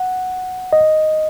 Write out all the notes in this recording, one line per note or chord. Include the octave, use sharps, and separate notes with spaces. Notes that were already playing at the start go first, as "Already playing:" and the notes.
Already playing: F#5
D#5